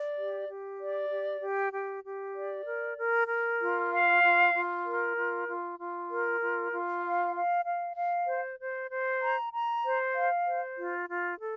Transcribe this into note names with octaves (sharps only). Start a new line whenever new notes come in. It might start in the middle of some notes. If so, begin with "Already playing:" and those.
Already playing: D5
G4
G4
D5
G4
G4
G4
G4
D5
A#4
A#4
A#4
F4
F5
F4
F4
A#4
F4
F4
F4
A#4
F4
F4
F5
F5
F5
F5
C5
C5
C5
A#5
A#5
C5
F5
C5
F4
F4
A4